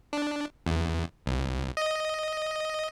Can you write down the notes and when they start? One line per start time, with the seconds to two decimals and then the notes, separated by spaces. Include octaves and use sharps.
0.13 D4
0.66 E2
1.26 C2
1.77 D#5